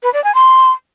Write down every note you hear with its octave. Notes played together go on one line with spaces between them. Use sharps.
B4
D5
G#5
C6